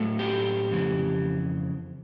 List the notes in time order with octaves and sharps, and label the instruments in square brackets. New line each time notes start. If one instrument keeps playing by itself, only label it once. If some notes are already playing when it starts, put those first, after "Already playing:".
Already playing: [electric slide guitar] A2 F#3 A3
G4
F2 C#3 E3